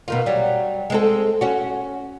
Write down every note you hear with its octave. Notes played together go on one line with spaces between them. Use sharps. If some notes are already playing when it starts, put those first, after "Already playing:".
B2 D#3 F4
F#3 G3
G#3 C4 A4
C#4 F#4